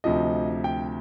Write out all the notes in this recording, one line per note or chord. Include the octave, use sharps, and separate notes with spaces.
D2 C3 F3 D#5
G5